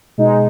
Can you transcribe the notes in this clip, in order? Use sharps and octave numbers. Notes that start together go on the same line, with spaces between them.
B2 G#3 D#4